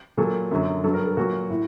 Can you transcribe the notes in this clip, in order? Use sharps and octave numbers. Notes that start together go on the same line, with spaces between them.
A#2 F#3 A4
F#2 D3 F#3
G2 F#3 A4
A#4
A4
A#2 F#3 F#4
A2